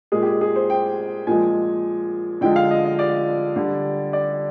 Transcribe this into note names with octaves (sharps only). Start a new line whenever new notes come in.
A#2 G#3 G#4
G4
G#4
G#4
C5
G5
A#2 F3 G#3 G#5
D3 F3 G#3 G5
F5
D#5
D#5
D5
D3 G3
D5